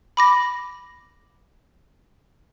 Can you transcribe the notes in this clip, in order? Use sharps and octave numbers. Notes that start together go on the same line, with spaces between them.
B5 D6 A#6